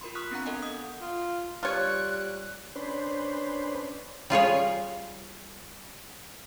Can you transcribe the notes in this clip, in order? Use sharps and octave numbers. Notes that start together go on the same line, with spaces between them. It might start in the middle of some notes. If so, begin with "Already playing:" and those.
F4 A#4 B5 C6
B5 C#6 D#6 F6 F#6 B6
B3 C4 D4 F5 F#5 A#5
A4 A#4 D#5 F5 F#5 G#5
D#6 G6
F4
G3 F4 C#5 F#6
C#4 D4 B4 C5
G3 F4 G#4 C#5